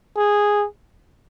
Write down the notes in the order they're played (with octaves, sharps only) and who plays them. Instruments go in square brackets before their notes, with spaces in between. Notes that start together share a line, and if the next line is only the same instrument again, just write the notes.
[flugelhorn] G#4